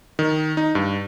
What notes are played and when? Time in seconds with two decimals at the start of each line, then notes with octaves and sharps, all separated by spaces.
0.19 D#3
0.57 D#4
0.75 G2